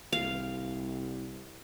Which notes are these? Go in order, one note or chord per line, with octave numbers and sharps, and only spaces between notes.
C2 F5